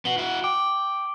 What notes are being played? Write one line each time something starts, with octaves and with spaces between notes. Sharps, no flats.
B3 F#4 F#7 G7
E4 F#4
G5 D6